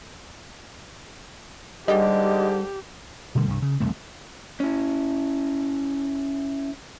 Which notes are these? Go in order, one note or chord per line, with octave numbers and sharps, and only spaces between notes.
G#2 D3 G3 G4 D#5
B2 D3 G3 A3
C2 G2
C#3
E1 C2 F2 A3
C#4 E4